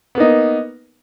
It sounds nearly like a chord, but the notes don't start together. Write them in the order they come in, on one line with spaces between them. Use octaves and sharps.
B3 A#3 D#4